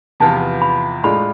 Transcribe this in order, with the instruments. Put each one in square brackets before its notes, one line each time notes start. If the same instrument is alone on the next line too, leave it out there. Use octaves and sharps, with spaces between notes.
[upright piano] E2 C3 F3 B3 F4 [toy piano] A5
[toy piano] B5
[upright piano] A2 G#3 D4 F4 [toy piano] B5